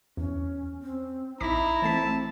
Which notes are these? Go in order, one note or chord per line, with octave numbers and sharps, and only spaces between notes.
E2 C#4
C4
A#1 D#4 E4 A#5 D6 B6
E3 A3 C4 A5 B6